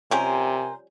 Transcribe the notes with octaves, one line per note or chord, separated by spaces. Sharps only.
C3 F3 G3 C#4 A#4 C5 G#5